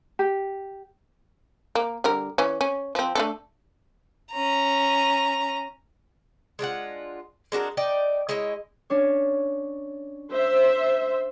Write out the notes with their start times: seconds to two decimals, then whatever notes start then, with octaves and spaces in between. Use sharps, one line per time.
0.19 G4
1.75 A#3
2.04 D3 G3 A#4
2.38 E3 C#4
2.61 C#4
2.95 F3 C4
3.15 A3 D4 A4
4.33 C#4 A#5
6.59 G#3 D4 F4 F#5
7.52 G#3 D4 F#4 A#4
7.77 D#4 D5 G5
8.29 G#3 E4 C#5 D#5
8.90 C#4 D4 C#5
10.31 C5 E5